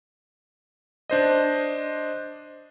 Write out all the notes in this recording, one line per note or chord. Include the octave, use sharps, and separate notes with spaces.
D4 C5 D#5